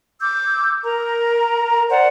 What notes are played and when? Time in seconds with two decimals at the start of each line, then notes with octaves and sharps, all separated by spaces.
0.21 D6 E6 G6
0.84 A#4 A#5
1.88 C5 D5 F#5